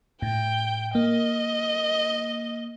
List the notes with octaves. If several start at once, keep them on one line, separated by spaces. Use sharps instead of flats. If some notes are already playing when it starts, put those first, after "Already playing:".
A2 G5
A#3 D#5